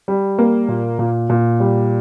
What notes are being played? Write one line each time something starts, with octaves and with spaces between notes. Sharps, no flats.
G3
A#3
A#2
A#2
A#2
G3